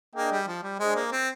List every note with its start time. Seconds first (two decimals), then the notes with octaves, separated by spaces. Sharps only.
0.15 A#3 D4 G#4 D#5 G5
0.32 G3
0.47 F3
0.63 G3
0.79 G#3 D4 G#4 C5 D#5
0.95 A#3
1.12 C4